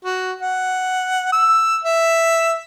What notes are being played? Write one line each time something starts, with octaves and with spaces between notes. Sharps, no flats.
F#4
F#5
E6
E5